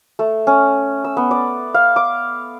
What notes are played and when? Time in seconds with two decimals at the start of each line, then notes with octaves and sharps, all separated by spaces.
0.19 A3
0.47 C#4
1.04 E6
1.17 B3
1.31 D5
1.74 F5
1.96 D6